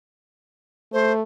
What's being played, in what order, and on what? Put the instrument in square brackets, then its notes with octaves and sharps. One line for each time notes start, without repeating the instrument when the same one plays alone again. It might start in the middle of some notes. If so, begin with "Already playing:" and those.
[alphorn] A3 [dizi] C5